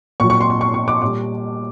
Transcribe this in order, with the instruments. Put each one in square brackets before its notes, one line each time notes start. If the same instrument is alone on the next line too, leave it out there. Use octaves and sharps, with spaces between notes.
[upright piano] A#2 F#3 C#6
C#6
C6
C#6
C#6
C#6
D6
A#2 G3 D6